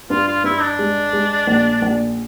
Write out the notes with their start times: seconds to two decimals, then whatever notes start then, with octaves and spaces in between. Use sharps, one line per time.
0.10 G2 F4
0.27 F4
0.44 G2 E4
0.62 D4
0.79 G#3
1.13 G#3
1.47 A#1
1.82 A#1